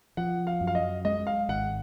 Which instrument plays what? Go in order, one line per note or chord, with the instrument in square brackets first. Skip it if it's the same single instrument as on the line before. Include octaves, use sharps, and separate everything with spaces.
[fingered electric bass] F3 [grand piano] F#5
[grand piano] F5
[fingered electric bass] F#2
[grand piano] F5
D#5
[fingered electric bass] G#3 [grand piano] D#5
[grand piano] F5
[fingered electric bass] G#1 [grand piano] F#5